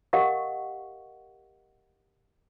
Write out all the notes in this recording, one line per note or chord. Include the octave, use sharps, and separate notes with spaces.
G4 A#4 D#5 F5 F#5 C#6